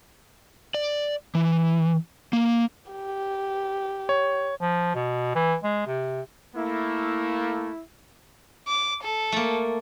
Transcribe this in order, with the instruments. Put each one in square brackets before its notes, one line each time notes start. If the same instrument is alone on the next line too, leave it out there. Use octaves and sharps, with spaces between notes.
[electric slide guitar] D5
E3
A#3
[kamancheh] G4
[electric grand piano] C#5
[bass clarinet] F3
B2
E3
G#3
C3
[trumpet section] A3 A#3 [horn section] E4
[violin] D6
A4
[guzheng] A3 A#3